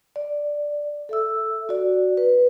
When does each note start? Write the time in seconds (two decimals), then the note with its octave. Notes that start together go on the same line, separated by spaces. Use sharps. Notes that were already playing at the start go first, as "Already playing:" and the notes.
0.16 D5
1.09 A4 E5 E6
1.69 F#4 D5
2.17 B4